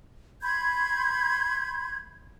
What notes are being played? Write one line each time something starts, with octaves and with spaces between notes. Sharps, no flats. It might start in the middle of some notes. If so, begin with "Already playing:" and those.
B5 C6 G6 G#6